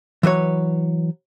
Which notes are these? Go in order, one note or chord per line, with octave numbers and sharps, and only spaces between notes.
E3 F#3 B4 C#5